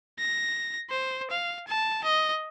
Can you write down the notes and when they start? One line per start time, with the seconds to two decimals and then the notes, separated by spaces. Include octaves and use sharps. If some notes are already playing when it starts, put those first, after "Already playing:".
0.19 A#6
0.90 C5
1.31 F5
1.68 A5
2.04 D#5